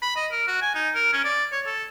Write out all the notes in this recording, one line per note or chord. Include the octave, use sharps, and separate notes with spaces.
B5
D#5
A#4
F#4
G#5
D#4
A#4
C#4
D5
C#5
A4